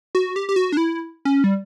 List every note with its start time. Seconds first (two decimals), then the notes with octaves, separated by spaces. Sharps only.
0.15 F#4
0.36 G4
0.49 G4
0.56 F#4
0.72 D4
0.77 E4
1.25 C#4
1.44 G3